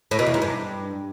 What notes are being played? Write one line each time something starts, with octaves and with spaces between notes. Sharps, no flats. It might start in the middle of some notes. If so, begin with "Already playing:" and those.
A2
B2
E2
G#2
G2